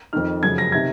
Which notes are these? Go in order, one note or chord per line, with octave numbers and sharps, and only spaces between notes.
F2 D#3 F6
F#2 C#3 F3 G#6
A#6
C3 D#3 G#6